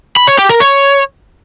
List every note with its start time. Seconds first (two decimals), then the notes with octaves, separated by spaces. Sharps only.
0.16 B5
0.27 C#5
0.38 G4
0.49 A#4
0.60 C#5